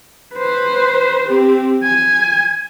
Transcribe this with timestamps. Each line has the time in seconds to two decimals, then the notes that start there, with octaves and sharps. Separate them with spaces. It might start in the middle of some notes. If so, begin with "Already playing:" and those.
0.35 B4 C5
1.27 C4 G4
1.83 G#5